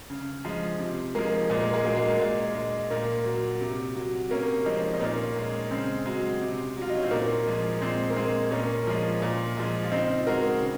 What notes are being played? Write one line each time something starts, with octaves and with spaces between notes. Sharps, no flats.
C#3
F3 G#3
C3
F3 G#3 A#3
A#2 G#3
A#3
G#3
F#3 A#3
G#3
A#3
A#2 G#3
G#3
A#2 A#3
F#3
C3
F#3
C3 A#3 C#4
F3 G#3 C4 D#4
D#4
A#2 A#3 C#4
G#3
C#3 G#3 C4
F#3 G#3
C3
F#3
F4
D#4
C#4
C4
A#2 A#3
F3 G#3
A#2 G#3 C4
A#3
G#3 C4
A#2 A#3 C#4
F3 G#3
A#2
F3 G#3
F4
C#3 C4 D#4
G#3 F#4 A#4
C#3